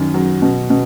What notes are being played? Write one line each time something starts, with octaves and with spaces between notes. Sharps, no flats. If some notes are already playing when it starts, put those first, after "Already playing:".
Already playing: F#2 D#3
F#3
B2
B2